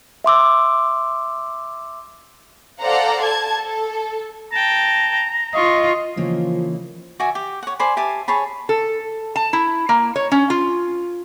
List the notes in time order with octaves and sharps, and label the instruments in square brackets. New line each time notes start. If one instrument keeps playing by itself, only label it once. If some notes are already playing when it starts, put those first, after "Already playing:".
[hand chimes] E5 C6 D6 E6
[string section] A4 C5 D5 F5 F#5 A#5
A5 G#6
A4
[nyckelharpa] G5 A5 [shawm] A#5
[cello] F4 [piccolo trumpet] D#5 [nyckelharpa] C#6
[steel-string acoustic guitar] C#3 E3 A#3 [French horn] F3
[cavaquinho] F#4 D5 E5 G#5
G4
C#5 F#5
C5 D5 G#5 B5
G4 E5 G#5 A5
G#4 C#5 A5 B5
[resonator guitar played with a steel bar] A4
A5
E4
A#3
C#5
C#4
F4